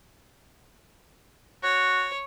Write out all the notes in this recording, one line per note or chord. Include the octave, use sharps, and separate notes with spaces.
F#4 C#5